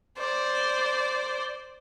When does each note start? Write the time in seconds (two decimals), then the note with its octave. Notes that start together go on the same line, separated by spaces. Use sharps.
0.18 C5 D5